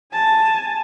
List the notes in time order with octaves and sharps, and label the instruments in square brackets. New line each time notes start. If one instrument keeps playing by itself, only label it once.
[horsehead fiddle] G#5 A5